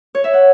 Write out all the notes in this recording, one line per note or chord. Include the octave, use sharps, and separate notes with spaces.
C#5
E5
F#5